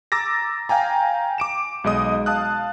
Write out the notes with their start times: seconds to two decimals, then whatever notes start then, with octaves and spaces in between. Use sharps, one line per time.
0.12 A#5 D6 E6 A6 A#6
0.69 F5 G5 G#5 A#5
1.38 D6 D7 E7
1.84 B1 G#3 D#5 D#6
2.26 F5 A5 D#6 F#6